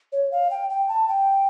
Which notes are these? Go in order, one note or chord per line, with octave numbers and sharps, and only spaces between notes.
C#5
F5
G5
G5
A5
G5